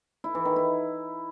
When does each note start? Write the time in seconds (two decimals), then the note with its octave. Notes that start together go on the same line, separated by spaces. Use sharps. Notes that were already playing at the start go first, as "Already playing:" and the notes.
0.24 E4
0.35 E3
0.45 D#3
0.56 E4